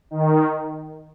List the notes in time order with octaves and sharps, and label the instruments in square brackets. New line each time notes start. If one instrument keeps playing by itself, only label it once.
[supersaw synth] D#3